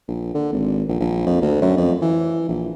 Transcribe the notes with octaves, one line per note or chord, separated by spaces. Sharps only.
A#1
D3
G#1
A#1
A#1
F2
D2
F#2
F2
E3
A#1